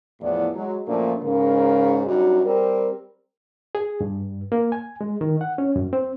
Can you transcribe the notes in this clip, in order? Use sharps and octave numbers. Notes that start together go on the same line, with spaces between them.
E2 A2 F3 B3 E4 D5
F#3 G#3
F#2 A#2 F3 A3 A#3 D4
G#2 C#3 A#4
F#2 G3 D4 D#4 F#4
G3 C4 G4 A#4
G#4
G2
A#3
G#5
G#3
D#3
F#5
C#4
F#2
C4